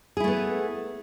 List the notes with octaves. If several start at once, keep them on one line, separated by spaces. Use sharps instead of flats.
A3 B3 E4 G#4